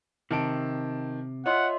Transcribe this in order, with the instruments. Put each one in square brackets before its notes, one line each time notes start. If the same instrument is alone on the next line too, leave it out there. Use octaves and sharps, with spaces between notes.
[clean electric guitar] C3 [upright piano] D#3 A5 D7
[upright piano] F4 E5 [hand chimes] C#5 D#5 C6 [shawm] F#5